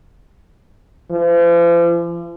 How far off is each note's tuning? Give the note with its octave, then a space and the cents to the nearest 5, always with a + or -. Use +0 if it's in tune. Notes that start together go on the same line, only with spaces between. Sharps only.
F3 -45